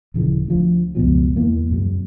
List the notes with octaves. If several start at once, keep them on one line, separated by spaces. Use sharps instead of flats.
D#1 C#3 E3 F3
D2 F3
C#2 F#2 B2 F3
E2 E3 A#3
F#2 C3 F#3